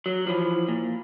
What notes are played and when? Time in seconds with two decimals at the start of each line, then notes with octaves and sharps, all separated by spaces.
0.06 F#3
0.27 E3 F3
0.68 A#2